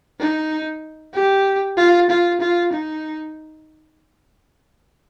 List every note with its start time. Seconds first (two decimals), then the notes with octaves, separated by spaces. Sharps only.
0.20 D#4
1.14 G4
1.77 F4
2.10 F4
2.41 F4
2.73 D#4